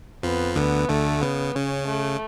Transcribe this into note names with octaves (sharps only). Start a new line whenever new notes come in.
F2 F3 B3
D2 D3 B3
D2 D3 A3
C#3 B3
C#3 C#4
A3